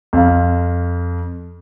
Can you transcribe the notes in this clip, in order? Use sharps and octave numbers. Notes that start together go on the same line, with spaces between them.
F2 F5